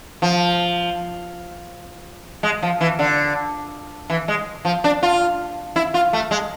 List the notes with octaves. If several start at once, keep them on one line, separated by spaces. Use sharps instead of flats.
F3
G#3
F3
E3
D3
E3
G#3
F3
D4
F4
E4
F4
A3
G#3